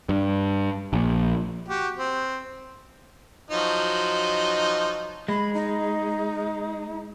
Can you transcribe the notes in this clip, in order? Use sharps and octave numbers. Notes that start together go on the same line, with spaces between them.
G2
A#1
F#4 G4
C4
F3 F#3 D#4
G#3 B5
D#4